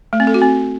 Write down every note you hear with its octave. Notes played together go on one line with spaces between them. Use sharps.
A3
C4
A4
F#4
C4